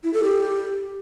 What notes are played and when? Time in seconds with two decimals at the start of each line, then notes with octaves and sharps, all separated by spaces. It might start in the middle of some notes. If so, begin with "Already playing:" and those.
0.04 E4
0.14 A4
0.24 G4